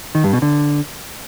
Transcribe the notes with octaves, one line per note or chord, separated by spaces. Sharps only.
D#3
G2
B2
D3